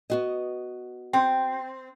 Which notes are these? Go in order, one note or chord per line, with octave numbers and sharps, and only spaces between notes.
B3 F#4 D#5
C4 G5